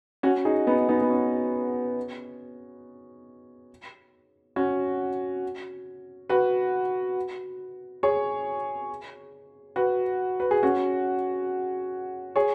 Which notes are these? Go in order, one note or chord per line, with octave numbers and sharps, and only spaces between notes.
C#4 F#4
D#4 G#4
B3 D#4
B3 D#4
B3
C#4
C#4 F#4
F#4 B4
G#4 C#5
F#4 B4
B4
G#4
C#4 F#4
G#4 C#5